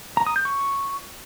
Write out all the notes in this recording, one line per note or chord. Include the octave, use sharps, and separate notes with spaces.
A#5
D#6
G6
C#6